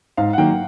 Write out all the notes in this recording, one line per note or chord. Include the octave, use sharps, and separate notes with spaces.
G#2 F5
F#5
D#3 F#3 A#3 G5